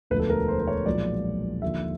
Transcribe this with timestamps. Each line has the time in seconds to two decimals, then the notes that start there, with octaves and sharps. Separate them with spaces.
0.10 E1 D2 D3 F3 B4
0.19 A4
0.30 A#4
0.48 C5
0.59 C5
0.67 C#5
0.86 B1 A#2 F3 G#3 D5
1.62 D#2 D3 F3 E5